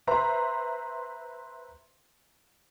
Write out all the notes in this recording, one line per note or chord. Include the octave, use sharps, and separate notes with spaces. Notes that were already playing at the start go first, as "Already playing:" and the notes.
B4 C5 E5 A#5 C6